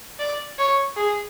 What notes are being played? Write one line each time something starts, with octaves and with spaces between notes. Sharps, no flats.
D5
C#5
G#4